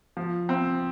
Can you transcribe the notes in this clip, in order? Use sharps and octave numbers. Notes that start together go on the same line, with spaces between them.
F3
C4